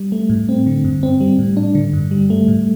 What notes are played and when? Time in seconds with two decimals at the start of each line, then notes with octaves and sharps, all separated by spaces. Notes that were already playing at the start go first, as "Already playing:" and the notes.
Already playing: G3
0.12 A3
0.29 A2
0.49 C4
0.66 D3
0.84 G2
1.03 C4
1.21 G3
1.39 A2
1.57 D4
1.75 D3
1.93 G2
2.11 G3
2.30 A3
2.48 A2